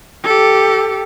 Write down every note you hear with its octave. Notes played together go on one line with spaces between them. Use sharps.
G4 A4